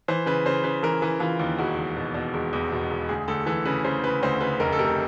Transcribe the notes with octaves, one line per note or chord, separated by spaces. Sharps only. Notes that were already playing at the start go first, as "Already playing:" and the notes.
E3 C5
C#3 B4
C#3 C5
C#3 B4
E3 A#4
E3
E3 F4
D#2
E1 F#4
E1
B2
B2
E1
E2
B2
E1
D2 G#4
D2 A4
E3 A4
C#3 B4
C#3 C5
C#3 B4
D2 C5
C#3 B4
F1 A#4
A4
C3 A#4